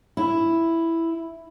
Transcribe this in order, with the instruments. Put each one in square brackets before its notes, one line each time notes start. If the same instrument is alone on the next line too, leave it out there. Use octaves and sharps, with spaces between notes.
[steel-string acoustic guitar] E4